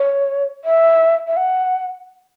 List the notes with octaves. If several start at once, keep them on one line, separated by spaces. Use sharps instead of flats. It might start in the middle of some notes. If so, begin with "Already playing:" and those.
Already playing: C#5
E5
E5
F#5